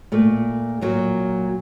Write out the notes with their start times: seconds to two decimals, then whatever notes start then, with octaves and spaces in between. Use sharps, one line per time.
0.12 A#2 A3
0.81 A#2 F#3